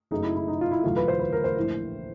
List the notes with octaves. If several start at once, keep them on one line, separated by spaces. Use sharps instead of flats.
F#1 F#2 C#3 F#3 A3 D#4
E4
E4
D#4
F4
E4
E1 D2 D3 F#3 A3 F4
B4
C5
B4
A#4
C5
A#1 A2 E3